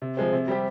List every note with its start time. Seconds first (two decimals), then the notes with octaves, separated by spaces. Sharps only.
0.02 C3
0.17 F3 G#3 C4
0.33 C3
0.48 G3 C4 G4